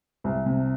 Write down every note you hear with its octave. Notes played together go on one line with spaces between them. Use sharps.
C2
C3